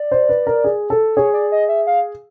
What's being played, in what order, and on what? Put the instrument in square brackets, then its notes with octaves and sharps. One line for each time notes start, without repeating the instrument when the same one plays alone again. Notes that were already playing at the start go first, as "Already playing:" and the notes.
Already playing: [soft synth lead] D5
[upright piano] C5
B4
A#4
G#4
A4
[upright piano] G#4 [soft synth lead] C#5
[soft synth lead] D5
D#5
E5
F5